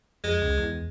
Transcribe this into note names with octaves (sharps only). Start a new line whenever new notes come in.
F2 G#3
C#2
E2